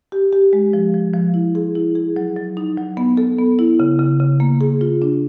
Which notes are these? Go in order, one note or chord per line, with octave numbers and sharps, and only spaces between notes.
G4
G4
G#3
F3
F3
F3
E4
G#4
E4
G#4
F#3
F#3
D#4
F#3
B3
A4
B3
E4
C#3
C#3
C#3
A#3
G#4
F4
D4